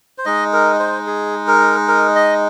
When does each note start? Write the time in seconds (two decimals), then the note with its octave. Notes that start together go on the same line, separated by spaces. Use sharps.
0.18 C5
0.25 G#3 D#4 D#5
0.53 A#4
0.80 C5
1.07 G#4
1.48 A#4
1.88 A#4
2.15 D#5